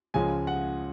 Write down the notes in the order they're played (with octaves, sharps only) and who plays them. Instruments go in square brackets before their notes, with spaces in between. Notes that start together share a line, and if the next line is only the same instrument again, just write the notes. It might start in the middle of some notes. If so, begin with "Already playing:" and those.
[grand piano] C#2 C#3 F3 G#3 G#5
F#5